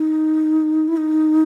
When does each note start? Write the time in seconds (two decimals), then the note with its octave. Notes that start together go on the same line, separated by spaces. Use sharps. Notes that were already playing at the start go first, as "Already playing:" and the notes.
Already playing: D#4
0.88 E4
0.97 D#4